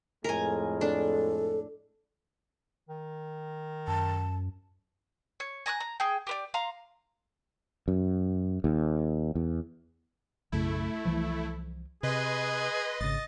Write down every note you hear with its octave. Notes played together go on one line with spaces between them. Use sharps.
F2 A2 G#3 A#4 G#5
D4 A4
D#3
F#2 A5
C#5
G#5 A#5 D6 F#6
A#5
G#4 G5
G4 B4 D5
F5 A#5 C6
F#2
D#2
E2
B1 F#2 C#3 A3 E4
C2 E3 F3
C3 G#4 B4 D#5 C6
G#1 C#3 D#5 A6